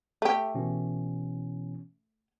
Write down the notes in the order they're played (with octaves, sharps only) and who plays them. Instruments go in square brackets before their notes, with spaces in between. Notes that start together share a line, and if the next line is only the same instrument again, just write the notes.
[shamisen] A3 G4 [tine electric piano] E5
[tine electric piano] B2 E3 C#4